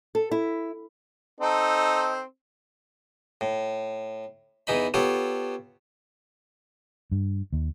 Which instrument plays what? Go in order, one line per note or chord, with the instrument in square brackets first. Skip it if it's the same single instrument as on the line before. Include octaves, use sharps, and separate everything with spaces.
[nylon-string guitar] A4
E4
[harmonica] C4 D#4 A4
[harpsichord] A2
E2 E3 D#4 B5
B3 F4 G4 A4 C#5
[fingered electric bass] G2
D#2